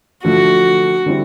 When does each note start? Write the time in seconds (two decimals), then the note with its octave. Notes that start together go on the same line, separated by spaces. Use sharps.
0.24 D3 F3 A3 F#4
1.06 D3 G3 C4 E4